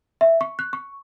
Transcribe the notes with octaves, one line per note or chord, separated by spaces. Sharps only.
E5
C#6
F#6
C#6